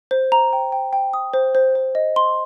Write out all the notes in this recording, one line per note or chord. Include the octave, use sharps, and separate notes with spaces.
C5
A#5
G5
G5
G5
D#6
C5
C5
C5
D#5
C6